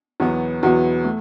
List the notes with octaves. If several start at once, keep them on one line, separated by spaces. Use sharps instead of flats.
E2 B2 F#3 B3
E2 B2 F#3 B3
A3